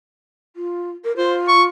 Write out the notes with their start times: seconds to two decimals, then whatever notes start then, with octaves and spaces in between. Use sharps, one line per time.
0.56 F4
1.04 A#4
1.17 F4 C5
1.48 C#6